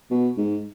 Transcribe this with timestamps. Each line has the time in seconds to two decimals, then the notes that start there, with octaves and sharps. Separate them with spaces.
0.11 B2
0.37 G#2